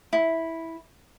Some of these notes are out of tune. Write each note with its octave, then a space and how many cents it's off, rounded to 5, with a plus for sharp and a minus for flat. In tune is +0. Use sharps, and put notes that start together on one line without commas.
E4 -10